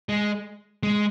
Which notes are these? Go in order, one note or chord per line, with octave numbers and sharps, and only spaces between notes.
G#3
G#3